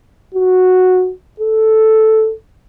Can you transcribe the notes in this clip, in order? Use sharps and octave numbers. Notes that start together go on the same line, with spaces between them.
F#4
A4